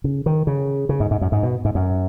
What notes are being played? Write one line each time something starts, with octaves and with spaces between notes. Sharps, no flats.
C#3
D#3
C#3
C#3
G#2
G#2
F#2
G#2
B2
G#2
F#2